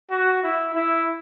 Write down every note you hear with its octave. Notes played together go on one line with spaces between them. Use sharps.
F#4
E4
E4